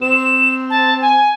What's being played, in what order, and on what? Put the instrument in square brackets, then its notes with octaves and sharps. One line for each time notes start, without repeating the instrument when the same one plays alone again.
[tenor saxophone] C4 [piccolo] E7
[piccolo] A5
G#5